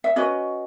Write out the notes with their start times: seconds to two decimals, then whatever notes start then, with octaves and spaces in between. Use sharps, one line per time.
0.04 E5
0.16 C#4 F#4 B4 D#5